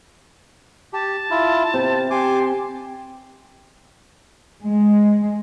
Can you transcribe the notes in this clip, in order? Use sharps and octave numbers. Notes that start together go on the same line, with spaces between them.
G4 A5
E4 F4
C3 C5
G4 G#5 C6 D6
G#3